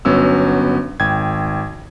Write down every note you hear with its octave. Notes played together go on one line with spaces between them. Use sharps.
G1 F#3 B3 C#4 E6
G#1 G5 G#6